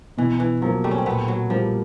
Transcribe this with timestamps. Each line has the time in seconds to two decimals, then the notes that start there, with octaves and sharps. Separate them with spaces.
0.17 B2 E3
0.40 E3
0.62 F3 F#3 A#3
0.84 G3 A3
0.91 C#4
0.98 C4
1.06 A#2 A3 B3
1.28 F#3
1.50 F3 G3 A#3